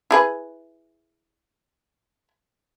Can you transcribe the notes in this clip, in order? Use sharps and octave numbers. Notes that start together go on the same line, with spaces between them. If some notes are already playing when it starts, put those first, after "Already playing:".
E4 G#4 B4